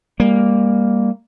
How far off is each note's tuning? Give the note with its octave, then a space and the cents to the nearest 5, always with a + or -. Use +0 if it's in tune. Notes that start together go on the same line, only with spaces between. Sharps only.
G3 +30 A#3 +0